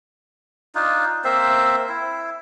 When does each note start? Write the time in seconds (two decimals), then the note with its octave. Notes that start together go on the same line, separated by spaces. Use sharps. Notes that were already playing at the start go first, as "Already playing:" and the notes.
0.75 D4 D#4 F4
1.24 A#3 C4 C5 E5
1.89 E4